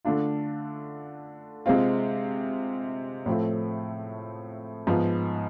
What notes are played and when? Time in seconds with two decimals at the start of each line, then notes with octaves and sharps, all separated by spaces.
0.05 D3 A3 D4 F4
1.66 C3 G#3 C4 F4
3.26 A2 F3 A3 C4
4.87 G#2 F3 B3